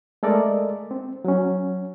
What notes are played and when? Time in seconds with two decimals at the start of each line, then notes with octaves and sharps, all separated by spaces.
0.23 G#3 A3 A4 A#4 D5 D#5
0.91 C4
1.25 F#3 C#4